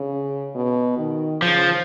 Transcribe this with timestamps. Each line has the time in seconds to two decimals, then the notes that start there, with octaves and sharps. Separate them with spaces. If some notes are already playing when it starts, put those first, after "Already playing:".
Already playing: C#3
0.55 B2
0.98 D#3
1.42 C#3 F3